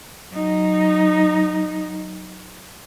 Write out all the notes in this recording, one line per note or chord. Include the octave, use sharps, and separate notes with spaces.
F#3 D#4